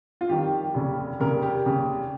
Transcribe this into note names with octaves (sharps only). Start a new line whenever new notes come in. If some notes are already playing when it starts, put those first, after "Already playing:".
F4
F2 D#3 G3 G4
F1 D#2 C#3
F1 D#2 C#3 A#4
G4
F1 D#2 C#3